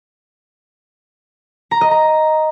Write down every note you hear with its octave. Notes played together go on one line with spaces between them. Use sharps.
A#5
D#5
A#5